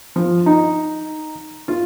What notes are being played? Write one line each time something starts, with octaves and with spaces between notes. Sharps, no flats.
F3
D#4
F4